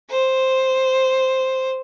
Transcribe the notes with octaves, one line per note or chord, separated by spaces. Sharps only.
C5